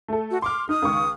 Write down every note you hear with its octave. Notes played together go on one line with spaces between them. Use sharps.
A3 A4
F#4
C6 D6 F6
D#4 D#6
C#2 D#3 C#6